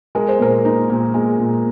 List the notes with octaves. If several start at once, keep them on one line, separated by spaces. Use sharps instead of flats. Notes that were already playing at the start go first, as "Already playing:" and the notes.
G#3 A#4
C5
A#2 A#4
D#4
A#2
G#3
A#2